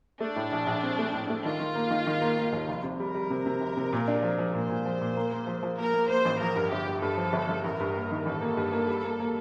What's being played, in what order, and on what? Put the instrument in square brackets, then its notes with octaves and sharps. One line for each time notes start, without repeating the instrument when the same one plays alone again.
[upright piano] A3 [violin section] D4
[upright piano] A2
A#1
A#1
C4
A3
A2
A3
[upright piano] D#3 [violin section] F4
[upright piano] D#3
A#3
D#3
D#3
A#3
A#3
D#2
F1
C3
[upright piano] G3 [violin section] A#4
[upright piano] G3
C3
C3
F1
C3
A#2
D4
F3
F3
[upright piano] A#2 [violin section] C5
[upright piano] A#2
F3
A#2
A#3
A#3
F3
F3
[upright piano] A#3 [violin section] A#4
[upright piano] A#3
[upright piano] A#3 [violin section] C5
[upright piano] A1
[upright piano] F3 [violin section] A#4
[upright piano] G2
[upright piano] G1 [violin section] G4
[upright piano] G2
[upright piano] G2 [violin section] A4
[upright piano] F3
G1
G1
[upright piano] A1 [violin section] A#4
[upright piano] G2
A#3
D#3
[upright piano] A1 [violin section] A4
[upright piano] A#3
G2
A#3
G3
A#3
A#3